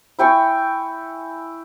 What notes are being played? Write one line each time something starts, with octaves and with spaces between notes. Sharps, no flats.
E4 G5 G#5 C#6